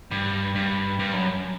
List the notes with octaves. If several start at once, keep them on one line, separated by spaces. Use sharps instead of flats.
G2
G2
G2
F#2